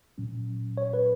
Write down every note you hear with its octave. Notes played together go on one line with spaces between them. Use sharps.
A#2 F#3 C#4
C#5
B4